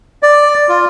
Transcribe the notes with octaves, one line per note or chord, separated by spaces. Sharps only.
D5
F4